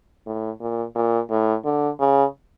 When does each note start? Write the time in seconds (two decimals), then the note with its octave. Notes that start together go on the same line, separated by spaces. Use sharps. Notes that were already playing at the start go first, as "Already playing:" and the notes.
0.26 A2
0.60 A#2
0.95 A#2
1.30 A2
1.65 D3
2.00 C#3